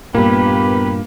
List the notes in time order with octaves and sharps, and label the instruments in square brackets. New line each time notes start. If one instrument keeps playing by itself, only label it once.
[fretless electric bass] G2 A#2 [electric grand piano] A#3 [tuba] B3 [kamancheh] G4 B4